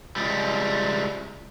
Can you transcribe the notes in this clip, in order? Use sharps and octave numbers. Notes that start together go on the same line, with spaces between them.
C#2 G3